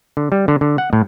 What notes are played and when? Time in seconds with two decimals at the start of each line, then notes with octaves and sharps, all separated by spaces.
0.17 D3
0.32 G3
0.48 D3
0.61 D3
0.78 F#5
0.93 A2